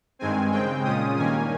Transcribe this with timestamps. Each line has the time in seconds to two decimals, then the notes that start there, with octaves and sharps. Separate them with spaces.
0.19 G2 D#3 G#3 C4 G#5
0.51 C#3 G#3 C4 G5
0.84 A#2 G#3 C#4 F4 D#6
1.16 G2 D#3 A#3 C#4 G#5